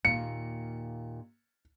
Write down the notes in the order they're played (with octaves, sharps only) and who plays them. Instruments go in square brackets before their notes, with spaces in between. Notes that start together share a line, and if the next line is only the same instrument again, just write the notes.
[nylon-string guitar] D#2 A#2 F5 [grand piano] C#7